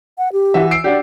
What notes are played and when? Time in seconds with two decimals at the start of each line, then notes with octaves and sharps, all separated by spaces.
0.18 F#5
0.33 G4
0.54 E3 F#4 E5
0.71 E6 C7 D7
0.84 D4 F#4 G4 D5